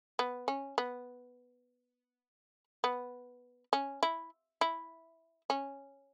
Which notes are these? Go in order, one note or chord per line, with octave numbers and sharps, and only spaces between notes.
B3
C#4
B3
B3
C#4
E4
E4
C#4